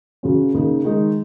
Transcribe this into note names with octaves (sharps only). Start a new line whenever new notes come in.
C#3 F#3 C#4 F#4
C#3 A#3 D#4
D#3 G#3 D#4